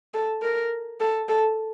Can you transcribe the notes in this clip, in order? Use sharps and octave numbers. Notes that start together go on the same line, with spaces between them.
A4
A#4
A4
A4